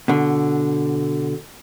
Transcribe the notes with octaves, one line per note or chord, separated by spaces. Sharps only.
B2 D3